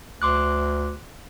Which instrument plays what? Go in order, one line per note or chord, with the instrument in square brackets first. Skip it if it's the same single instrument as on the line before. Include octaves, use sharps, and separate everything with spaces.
[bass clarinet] D2 [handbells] C6 D6 F#6